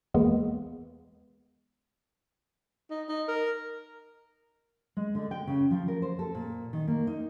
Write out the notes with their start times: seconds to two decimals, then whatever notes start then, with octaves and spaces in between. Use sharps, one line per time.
0.14 E2 G#3 A#3 B3
2.90 D#4
3.09 D#4
3.28 A#4
4.97 G#3
5.15 D3
5.31 G5
5.47 C#3
5.71 F3
5.88 A#4
6.02 C5
6.19 A4
6.35 A#2
6.73 D#3
6.87 A#3
7.07 D#4